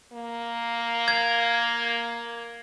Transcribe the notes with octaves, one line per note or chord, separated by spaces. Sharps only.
A#3
G#6